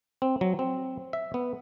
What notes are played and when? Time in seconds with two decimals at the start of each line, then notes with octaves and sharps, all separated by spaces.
0.22 C4
0.41 F#3
0.59 C4
1.13 E5
1.34 B3